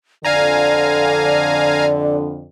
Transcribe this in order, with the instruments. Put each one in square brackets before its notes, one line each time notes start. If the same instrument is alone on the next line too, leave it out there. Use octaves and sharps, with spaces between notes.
[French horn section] F2 D3 [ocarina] D5 [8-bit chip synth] F5 G#5 A#5